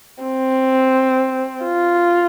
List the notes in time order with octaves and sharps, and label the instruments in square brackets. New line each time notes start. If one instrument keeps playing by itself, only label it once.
[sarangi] C4
F4